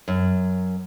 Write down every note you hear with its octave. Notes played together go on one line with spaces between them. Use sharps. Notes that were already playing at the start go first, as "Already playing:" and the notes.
F#2